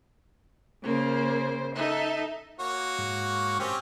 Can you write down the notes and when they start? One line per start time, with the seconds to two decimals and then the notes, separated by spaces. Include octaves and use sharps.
0.84 C#3 A#3 C5
1.76 D#4 A4 E5
2.60 A#3 F#4 C#5
2.98 G#2
3.59 C4 C#4 G4